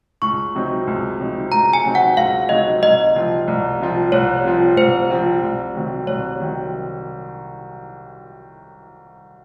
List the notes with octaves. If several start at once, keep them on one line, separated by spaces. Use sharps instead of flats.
C#2 C#6
C3 F#3 C4 D#4
C#2
C3 F#3 C4 D#4
C#2 A#5
G#5
C3 F#3 C4 D#4
F#5
C#2 F5
C3 F#3 C4 D#4 D#5
C2 D#5
C3 F3 C4 F4
C2
C3 F3 C4 F4
C2 C#5
C3 F3 C4 F4
C2 C5
C3 F3 C4 F4
C2
C3 D#3 F#3 C4
C2 C#5
C3 D#3 F#3 C4